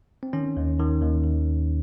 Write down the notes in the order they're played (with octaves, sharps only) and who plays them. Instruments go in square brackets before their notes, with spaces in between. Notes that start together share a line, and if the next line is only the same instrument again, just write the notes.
[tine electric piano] C4
D#3 C#4
D#2
D#3
D#2
D#3